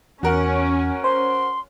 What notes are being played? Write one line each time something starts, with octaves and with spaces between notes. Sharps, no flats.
E2 C#4 F#4 A#4 F#5
C5 C6